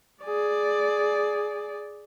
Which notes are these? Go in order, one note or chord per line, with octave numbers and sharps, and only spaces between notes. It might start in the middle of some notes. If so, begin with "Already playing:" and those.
G#4 D5